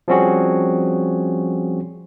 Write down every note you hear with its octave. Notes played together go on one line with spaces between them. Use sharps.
F3 G3 C4 C#4 F#4 G#4